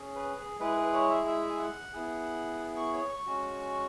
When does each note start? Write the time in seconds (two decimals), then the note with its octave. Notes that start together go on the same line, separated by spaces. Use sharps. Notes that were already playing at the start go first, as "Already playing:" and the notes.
Already playing: C#4 G#4
0.15 B4
0.38 G#4
0.59 G#3 E4 G#4 B4
0.77 B4
0.93 C#5
1.10 E5
1.27 E5
1.50 G#5
1.59 F#5
1.93 B3 E4 G#4
2.77 C#6
2.93 C#5
3.09 C#6
3.26 G#3 C#4 F#4